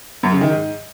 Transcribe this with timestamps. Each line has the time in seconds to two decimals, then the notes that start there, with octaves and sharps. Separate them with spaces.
0.23 F#2
0.32 C#3
0.41 D#3
0.50 G#2